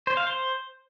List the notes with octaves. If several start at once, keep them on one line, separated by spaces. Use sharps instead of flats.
C5
F5
C5